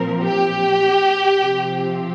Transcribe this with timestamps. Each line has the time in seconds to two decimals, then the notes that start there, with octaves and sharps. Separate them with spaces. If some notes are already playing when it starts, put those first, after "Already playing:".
Already playing: A#2 F3 C4 A#4
0.23 G4
1.40 C3 F3 C4